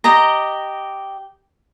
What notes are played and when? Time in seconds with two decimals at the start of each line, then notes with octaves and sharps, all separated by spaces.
0.04 G4 D#5 A#5